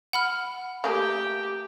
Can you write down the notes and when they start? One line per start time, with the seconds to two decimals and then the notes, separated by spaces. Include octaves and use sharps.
0.13 F#5 B5 F6
0.84 A3 A#3 G4 G#4 G5